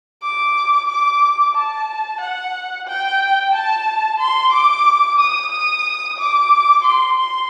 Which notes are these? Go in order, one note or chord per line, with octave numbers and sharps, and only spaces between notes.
D6
D6
A5
F#5
G5
A5
C6
D6
D#6
D#6
D6
C6
C6